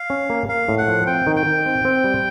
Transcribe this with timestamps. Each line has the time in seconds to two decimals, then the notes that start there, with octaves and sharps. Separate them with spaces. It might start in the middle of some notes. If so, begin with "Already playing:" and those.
Already playing: F5
0.10 C#4
0.30 A#3
0.49 A#3 F5
0.68 A2
0.78 F#5
0.88 F3
1.07 C4 G5
1.27 D#3
1.36 G5
1.46 D#3
1.66 C4
1.85 C4
2.04 G3